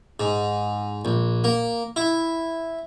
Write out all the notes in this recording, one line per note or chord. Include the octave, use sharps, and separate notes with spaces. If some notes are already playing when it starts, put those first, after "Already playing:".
G#2
A#1
A#3
E4